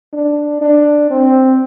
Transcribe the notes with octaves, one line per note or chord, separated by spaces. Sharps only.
D4
D4
C4